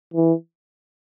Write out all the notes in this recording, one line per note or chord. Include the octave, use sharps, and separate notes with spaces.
E3